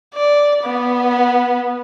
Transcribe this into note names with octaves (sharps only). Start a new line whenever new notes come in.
D5
B3